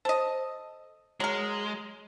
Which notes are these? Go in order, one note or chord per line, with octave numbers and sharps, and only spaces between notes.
A4 C5 D#5
F#3 G#3 A#4